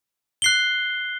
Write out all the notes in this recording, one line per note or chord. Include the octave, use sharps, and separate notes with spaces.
F#6 C7 G7